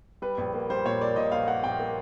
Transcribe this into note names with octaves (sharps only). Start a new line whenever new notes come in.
G3 B4
A#1
A#3
G3 C5
A#2 C#5
A#3 D5
A#2 D#5
A#1 F5
A#3 F#5
A#1 G5
A#3